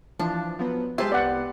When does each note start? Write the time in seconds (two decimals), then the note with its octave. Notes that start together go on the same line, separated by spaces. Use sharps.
0.19 E3 F3 D4
0.59 F3 F#3 B3
0.98 G#3 G4 C5 E5 A5 C6
1.12 C2 B3 D5 F#5